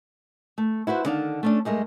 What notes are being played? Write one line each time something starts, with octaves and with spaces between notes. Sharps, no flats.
A3
E4 F#4 B4 C5
D3 D#3 D4 A4 F5
A3 C#4 D4
G2 G#3 A3 A#4